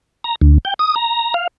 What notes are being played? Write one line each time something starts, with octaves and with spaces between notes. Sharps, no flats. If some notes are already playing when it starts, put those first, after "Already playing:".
A#5
D2
G5
D#6
A#5
F5